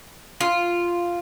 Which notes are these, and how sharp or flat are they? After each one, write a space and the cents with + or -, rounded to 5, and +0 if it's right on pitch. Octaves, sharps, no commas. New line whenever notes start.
F4 -5